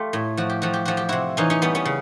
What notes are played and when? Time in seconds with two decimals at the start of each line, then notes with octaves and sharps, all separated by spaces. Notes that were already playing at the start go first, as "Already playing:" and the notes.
Already playing: A3 F4 G4 A4
0.13 A2
0.37 F3 F#4
0.50 G4
0.62 F3 F#4
0.74 G4
0.85 F3 F#4
0.97 G4
1.09 C3 E4 F#4
1.37 E3 C#4 D#4
1.50 C#4 D#4
1.62 G3 B3 C#4
1.75 B3 C#4
1.85 C#3